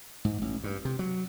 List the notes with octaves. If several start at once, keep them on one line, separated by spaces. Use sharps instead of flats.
G#2
A1
G2
C3
F#3